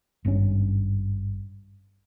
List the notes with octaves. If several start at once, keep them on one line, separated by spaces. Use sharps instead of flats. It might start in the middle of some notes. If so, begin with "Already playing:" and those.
G#1 G2 C#3 C#4